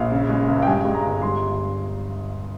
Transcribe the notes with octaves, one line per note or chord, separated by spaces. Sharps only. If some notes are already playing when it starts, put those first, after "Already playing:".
Already playing: A#1 F5
C#3
G#3
C#2
G5
G2 G#5
G#3
A#5
G1
G2 C6